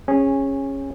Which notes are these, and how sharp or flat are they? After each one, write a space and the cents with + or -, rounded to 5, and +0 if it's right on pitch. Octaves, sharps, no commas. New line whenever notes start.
C#4 -15 G#4 -20